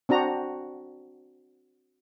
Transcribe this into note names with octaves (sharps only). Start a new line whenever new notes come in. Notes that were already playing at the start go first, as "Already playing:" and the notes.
C4 D4 F#4 A#5